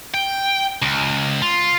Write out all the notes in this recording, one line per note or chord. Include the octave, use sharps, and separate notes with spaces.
G5
C#2
F4